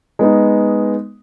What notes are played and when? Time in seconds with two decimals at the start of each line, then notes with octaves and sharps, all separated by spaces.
0.19 G#3 B3 D#4